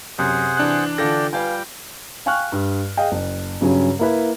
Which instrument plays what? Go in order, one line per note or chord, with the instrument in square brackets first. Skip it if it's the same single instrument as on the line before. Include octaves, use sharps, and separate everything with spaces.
[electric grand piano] F#2 [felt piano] C3 [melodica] G#4 C5 F#5
[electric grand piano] E3 D4 F#6
[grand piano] D3 F4 A4 [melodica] D5 G5 [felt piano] A#6
[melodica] G3 G5 [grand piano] F4 [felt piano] B4 F5 G#5
[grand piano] F5 G5 G#5 C#6 F6 F#6
G2
G#4 D#5 F5 G5
F#1
G2 C#3 F#3 C#4
A#3 E4 B4